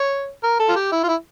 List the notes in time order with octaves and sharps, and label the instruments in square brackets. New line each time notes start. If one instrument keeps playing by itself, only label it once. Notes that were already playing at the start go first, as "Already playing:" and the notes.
Already playing: [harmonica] C#5
A#4
A4
F4
G4
E4
F4
E4